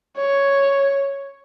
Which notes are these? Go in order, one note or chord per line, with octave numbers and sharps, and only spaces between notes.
C#5